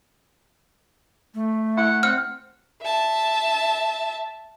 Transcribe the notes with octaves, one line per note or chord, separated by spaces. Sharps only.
A3
E4 F#5
C4 F#5 F6
E5 A5